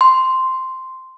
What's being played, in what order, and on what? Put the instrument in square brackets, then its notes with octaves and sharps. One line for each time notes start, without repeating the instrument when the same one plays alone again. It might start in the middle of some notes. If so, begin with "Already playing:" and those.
[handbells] C6